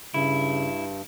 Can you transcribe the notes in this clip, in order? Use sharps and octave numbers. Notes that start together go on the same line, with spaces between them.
G2 C#3 E4